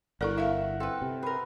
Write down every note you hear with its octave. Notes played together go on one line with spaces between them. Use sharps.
G1 E4 A4 A#4 D5 F#5
E4 E5 F5
C4 A4 B4
C3
G#4 A#4 B4